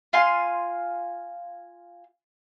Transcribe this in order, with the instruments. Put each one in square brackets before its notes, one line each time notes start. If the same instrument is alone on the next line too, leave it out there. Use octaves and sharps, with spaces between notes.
[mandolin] F4 F5 G#5 C6